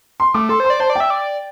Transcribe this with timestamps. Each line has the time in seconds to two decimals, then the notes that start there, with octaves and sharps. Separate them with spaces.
0.20 C6
0.34 A3 D6
0.49 A4 C6
0.60 C5 C6
0.70 D5
0.80 C5 A5
0.90 D5
0.96 E5 G5
1.10 D5